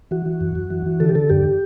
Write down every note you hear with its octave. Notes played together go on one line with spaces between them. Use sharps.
E3 F#4
E3
F#2
F#2
E3
E3
D3 A4
G4
D3 A4
F#2 G4